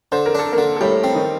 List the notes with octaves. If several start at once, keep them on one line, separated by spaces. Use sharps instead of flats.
D3 C5
A#4
D4 A4
A#3 A#4
D3
A4
A2 G3 G4
C4
D#3 D#4